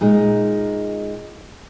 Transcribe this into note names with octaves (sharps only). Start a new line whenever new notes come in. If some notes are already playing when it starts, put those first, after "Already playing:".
A#2 G#3 D#4